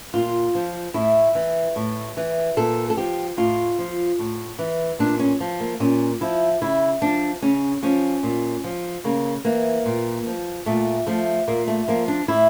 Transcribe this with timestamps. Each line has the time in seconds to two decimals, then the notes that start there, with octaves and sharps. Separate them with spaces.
0.14 A#2 F4
0.55 F3
0.94 A2 E4
1.35 E3
1.76 A2
2.17 E3
2.57 A#2 A4
2.90 A4
2.97 F3 G4
3.37 A2 F4
3.79 F3
4.19 A2
4.59 E3
4.99 A#2 D4
5.19 C#4
5.40 F3
5.60 A#3
5.80 A#2 C#4
6.21 F3 E4
6.61 C#3 E4
7.02 F3 D4
7.42 C#3 C#4
7.83 F3 C#4
8.23 A#2
8.64 F3
9.04 C#3 A#3
9.45 E3 A#3
9.86 A#2
10.26 F3
10.66 A#2 A3
11.07 F3 A3
11.48 A#2 A#3
11.68 A3
11.88 F3 A#3
12.08 D4
12.28 A2 E4